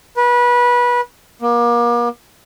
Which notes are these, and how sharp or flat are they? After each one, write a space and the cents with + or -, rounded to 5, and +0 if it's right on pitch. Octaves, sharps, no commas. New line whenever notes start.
B4 -25
A#3 +35